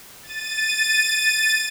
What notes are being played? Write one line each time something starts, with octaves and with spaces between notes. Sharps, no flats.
A6 D#7